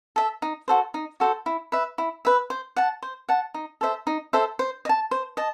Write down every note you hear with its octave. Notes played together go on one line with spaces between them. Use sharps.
A4 E5
D#4
F#4 A4 C5
D#4
F#4 A4 C5
E4
B4 E5
E4
B4 E5
C5
F#5 A5
C5
F#5 A5
D#4
A4 C5 E5
D#4
A4 C5 E5
C5
D#5
A5
C5
D#5 A5